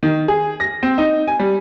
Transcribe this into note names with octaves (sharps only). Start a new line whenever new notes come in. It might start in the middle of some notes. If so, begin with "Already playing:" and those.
D#3
G#4
A#6
C4
D#4
G#5
G3